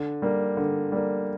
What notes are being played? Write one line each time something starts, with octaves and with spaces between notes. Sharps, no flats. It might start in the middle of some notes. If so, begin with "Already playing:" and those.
Already playing: D3
G3 A#3
D3
G3 A#3